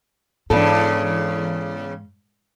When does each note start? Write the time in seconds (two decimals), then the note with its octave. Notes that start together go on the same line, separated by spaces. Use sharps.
0.50 E2 G#2 C#3 D4 A4